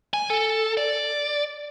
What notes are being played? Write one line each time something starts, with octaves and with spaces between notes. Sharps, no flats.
G#5
A4
D5